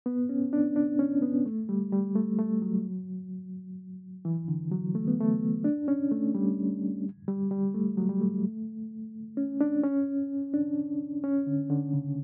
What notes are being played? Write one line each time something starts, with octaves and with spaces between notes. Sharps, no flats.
B3
C#4
D4
D4
C#4
B3
A3
G3
G3
A3
A3
F#3
E3
D3
F#3
A3
B3
A3
D4
C#4
A3
G3
G3
G3
A3
F#3
G3
A3
C#4
D4
C#4
D4
C#4
D3
D3
C#3